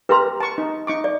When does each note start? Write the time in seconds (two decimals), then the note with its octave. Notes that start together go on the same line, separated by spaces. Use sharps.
0.09 G4 A#4 B4 A#5 C6
0.41 A5 C#6
0.58 D#4
0.87 D#4 C#6 D6
1.04 D5